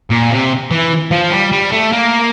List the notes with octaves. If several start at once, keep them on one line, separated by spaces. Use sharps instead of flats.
A#2
C3
E3
F3
G3
G3
A3
A#3